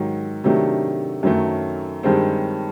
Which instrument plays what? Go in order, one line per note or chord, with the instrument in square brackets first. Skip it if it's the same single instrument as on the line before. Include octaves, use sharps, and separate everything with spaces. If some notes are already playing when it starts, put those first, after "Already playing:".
Already playing: [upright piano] G#2 D#3 F#3
C3 D#3 F#3 A3 D4
F#2 D#3 F#3 A3
G2 D#3 G#3 C4